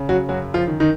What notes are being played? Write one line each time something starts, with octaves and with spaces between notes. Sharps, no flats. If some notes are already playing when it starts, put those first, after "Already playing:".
Already playing: C#3
F#3 F#4
F#2 F#3 F#4
F3 F4
D#3
D#3 D#4